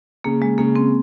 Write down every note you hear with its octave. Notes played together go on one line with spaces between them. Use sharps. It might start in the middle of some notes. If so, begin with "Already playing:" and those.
C#3 A#3
G#3
C#3 A#3
C4